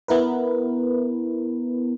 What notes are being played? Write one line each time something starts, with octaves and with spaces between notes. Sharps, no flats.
B3 E4 A#4 B4